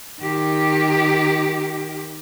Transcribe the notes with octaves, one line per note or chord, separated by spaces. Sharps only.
D#3 G4